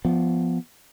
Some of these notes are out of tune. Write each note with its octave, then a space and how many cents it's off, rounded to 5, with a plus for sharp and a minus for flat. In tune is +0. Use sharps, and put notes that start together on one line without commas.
F3 +0 B3 +0